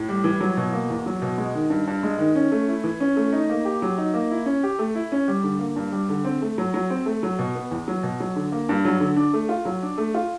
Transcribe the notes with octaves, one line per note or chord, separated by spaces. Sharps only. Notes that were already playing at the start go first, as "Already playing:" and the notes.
Already playing: A2
G3
E3
F#3
B2
A#3
E2
F#3
B2
G#3
D#3
G2
G2
G#3
D#3
C#4
A3
E4
E3
C#4
A3
D#4
A#3
G4
F#3
D#4
A#3
E4
C#4
G4
A3
E4
C#4
G3
D3
A#3
G2
G3
D3
C4
A3
F#3
F#3
C4
A3
F#3
B2
B3
E2
F#3
B2
F#3
D3
A#3
G2
F#3
D3
D4
A3
F4
F#3
D4
A3
F4